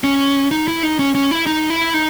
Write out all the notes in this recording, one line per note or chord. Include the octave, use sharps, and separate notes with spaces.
C#4
D#4
E4
D#4
C#4
C#4
E4
D#4
E4
D#4